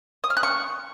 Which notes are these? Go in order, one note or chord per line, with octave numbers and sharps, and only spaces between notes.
D#6
F6
F#6
C#6